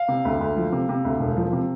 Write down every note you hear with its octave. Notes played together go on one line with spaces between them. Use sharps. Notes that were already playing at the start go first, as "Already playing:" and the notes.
Already playing: F5
C3
D2
D2
F3
C3
C3
D2
E1
F3
C3